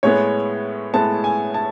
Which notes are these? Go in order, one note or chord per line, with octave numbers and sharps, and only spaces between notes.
A2 G#3 B3 C#5
A2 G#3 B3 A5
G#5
A5